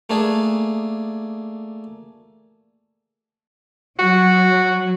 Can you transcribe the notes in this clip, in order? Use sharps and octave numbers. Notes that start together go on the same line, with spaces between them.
A3 A#3 D4 G#4
F#3 F#4